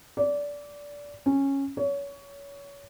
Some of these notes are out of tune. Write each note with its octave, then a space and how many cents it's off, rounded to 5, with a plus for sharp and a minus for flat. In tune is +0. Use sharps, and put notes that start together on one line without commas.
D5 -20
C#4 -10
C#5 +25